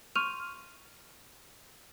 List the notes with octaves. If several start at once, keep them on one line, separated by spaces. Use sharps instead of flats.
C6 C#6 F6 G6 D#7 F7